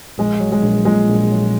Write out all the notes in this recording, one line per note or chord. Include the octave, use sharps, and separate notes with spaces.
A#1 G#3
F#3
G#3
A#1
A#2 G#3
A#1
F#3